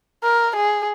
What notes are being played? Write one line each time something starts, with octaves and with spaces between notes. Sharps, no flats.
A#4
G#4